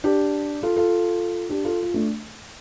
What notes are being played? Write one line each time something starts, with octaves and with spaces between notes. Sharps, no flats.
D4 G4
F4 A4
F4 A4
D4 G4
F4 A4
F4
A3 D4